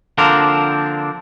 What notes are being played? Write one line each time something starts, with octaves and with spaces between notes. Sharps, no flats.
D3 F3 A#3 C4 D4 A#4